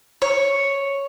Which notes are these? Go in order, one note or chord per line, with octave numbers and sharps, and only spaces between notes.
C#5